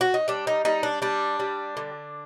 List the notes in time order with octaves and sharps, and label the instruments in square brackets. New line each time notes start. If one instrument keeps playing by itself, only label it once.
[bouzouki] F#4
D#4
G3 D4
D#4
G3 D#4
D4
G3 D4
G3
D3